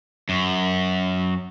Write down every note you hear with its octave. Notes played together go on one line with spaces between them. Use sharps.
F#2